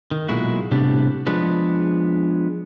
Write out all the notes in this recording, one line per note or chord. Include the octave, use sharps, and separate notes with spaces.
D#3
B1 A#2 G#3 E4 F#4
A2 C3 G3 B3 D4
F3 G#3 B3 D4 B4